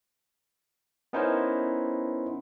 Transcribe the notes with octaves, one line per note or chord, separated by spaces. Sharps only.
B3 C#4 D#4 E4 A#4 C5